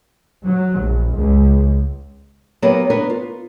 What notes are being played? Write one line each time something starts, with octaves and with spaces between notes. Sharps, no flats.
F#3
A#1
C#2
F#3 A#3 B3 D#4 G4 A#4
B3 D4 A#4 B4 C#5
F4